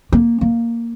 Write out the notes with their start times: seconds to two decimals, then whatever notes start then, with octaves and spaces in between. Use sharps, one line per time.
0.12 A#3
0.41 A#3